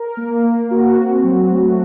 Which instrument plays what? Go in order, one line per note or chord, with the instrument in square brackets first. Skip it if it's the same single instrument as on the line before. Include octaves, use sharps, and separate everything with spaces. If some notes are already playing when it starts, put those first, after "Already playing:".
Already playing: [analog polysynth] A#4
A#3
A#3
F#4
C4
F#3
A3